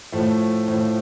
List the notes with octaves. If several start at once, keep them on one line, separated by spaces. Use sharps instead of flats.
A2 F3 A3
A2 F3